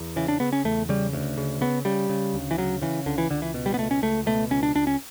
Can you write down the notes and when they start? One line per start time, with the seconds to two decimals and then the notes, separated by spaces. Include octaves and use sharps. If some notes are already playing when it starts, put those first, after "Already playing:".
Already playing: E2
0.16 C#3 E3
0.28 D4
0.40 C#3 B3
0.53 C#4
0.64 E2 A3
0.89 C#3 G3
1.13 D2
1.37 C#3
1.61 C#3 B3
1.85 C#3 G3
2.10 C#3
2.33 D2
2.51 E3
2.58 C#3 F#3
2.82 C#3 E3
3.06 C#2 D3
3.18 E3
3.30 C#2 D3
3.42 E3
3.54 B2
3.66 G3
3.74 B3
3.78 C#2 A3
3.91 C#4
4.02 C#2 A3
4.26 B2 A3
4.51 C#2 C#4
4.63 D4
4.75 C#2 D4
4.87 C#4